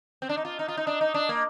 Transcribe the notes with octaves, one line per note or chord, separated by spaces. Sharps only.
C4
D4
D#4
F4
D#4
F4
D#4
D4
D#4
D4
A#3